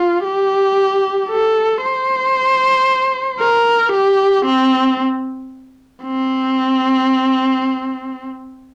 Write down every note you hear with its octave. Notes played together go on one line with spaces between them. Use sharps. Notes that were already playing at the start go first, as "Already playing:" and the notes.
Already playing: F4
G4
A4
C5
A#4
G4
C4
C4